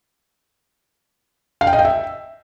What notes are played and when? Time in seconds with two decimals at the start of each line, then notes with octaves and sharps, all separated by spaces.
1.61 F5
1.67 G5
1.73 D#5
1.79 G5
1.85 E5